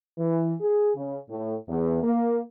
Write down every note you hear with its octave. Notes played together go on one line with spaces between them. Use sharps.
E3
G#4
C#3
A2
E2
A#3